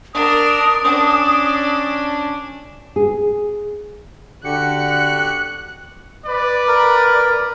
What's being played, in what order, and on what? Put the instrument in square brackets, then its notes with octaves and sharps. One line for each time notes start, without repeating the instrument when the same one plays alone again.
[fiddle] D4 A#4 [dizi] D#6
[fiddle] C#4 D4
[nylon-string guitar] G#4
[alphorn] D3 [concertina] F#4 G4 [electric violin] F#6 [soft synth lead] C#7
[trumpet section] B4 D5
[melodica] A#4